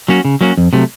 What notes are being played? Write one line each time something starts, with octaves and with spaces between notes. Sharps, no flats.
F#3 A#3 C#4 F#4
C#3
F#3 A#3 C#4 F#4
F2
C3 F#3 A3